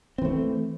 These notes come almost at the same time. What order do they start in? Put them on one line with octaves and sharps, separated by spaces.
C4 E3 A3